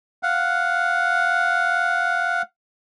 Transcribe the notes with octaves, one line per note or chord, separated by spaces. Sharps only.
F5 F#5